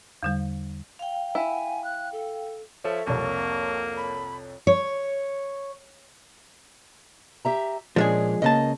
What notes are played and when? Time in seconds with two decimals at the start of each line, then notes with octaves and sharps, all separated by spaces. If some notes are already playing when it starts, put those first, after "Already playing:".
0.23 E2 D3 G3
0.99 F5 G5
1.35 E4 G#5
1.84 F#6
2.12 A4
2.84 F3 A4 C#5 E5
3.07 C2 F2 A#3 C#6
3.97 B5
4.67 C#5
7.45 G4 E5 A#5
7.96 A#2 F3 G#3 C#4 D4 G#4
8.42 C#2 C#3 A#3 D#5 A5